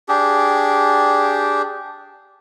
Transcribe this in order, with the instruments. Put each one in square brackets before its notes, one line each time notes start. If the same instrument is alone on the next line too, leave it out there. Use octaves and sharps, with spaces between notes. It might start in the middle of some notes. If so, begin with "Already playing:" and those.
[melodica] D4 G4 G#4